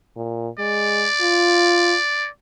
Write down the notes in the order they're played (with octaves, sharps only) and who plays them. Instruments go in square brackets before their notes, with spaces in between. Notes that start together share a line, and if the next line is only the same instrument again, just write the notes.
[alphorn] A#2
[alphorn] G#3 [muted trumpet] D5
[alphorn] F4